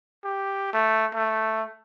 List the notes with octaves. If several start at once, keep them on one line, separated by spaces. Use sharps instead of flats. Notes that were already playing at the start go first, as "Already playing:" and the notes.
G4
A3
A3